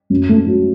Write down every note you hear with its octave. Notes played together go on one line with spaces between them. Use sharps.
F#2
A3
F#3